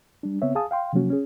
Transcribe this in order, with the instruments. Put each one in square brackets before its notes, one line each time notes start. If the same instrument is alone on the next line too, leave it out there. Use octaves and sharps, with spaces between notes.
[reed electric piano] G3 D4
C#3 B3 C4 C#5 E5
G#4 F5 G#5 A5 D#6
F5 G5 C6
C3 F3 F#3 A#3 C#4 F#4
C#4 G#4